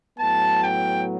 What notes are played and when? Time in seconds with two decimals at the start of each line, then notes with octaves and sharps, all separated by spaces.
0.18 A2 F#3 B3 A5
0.64 G5